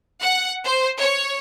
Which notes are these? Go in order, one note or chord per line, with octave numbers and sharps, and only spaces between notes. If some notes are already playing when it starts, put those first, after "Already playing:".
F#5
C5
C#5